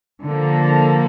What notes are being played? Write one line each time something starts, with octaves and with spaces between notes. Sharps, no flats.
D3 F3 A#3